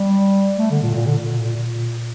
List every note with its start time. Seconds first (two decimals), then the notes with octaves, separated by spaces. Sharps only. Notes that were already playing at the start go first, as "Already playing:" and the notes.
Already playing: G3
0.58 A3
0.71 D3
0.82 A#2
0.95 A#2
1.06 D3
1.18 A#2
1.31 A#2
1.43 A#2
1.56 A#2